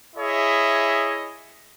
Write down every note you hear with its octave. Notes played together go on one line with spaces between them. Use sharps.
E4 G#4 C#5 D#5 E5